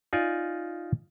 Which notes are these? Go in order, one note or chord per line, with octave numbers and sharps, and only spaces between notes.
D#4 F4 D5 G#5